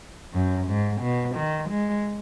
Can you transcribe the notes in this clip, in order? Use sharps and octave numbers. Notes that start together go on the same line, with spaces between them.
F#2
G#2
B2
D#3
G#3